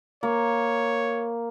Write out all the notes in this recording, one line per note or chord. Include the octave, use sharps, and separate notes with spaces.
A#3 C#5